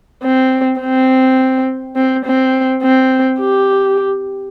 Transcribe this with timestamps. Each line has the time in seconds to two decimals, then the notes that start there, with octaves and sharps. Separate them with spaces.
0.24 C4
0.81 C4
1.96 C4
2.25 C4
2.82 C4
3.40 G4